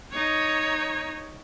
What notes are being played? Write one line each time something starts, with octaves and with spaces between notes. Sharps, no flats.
D#4 C#5